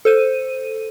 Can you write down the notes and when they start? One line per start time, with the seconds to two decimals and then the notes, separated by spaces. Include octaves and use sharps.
0.05 A4 C5 D#7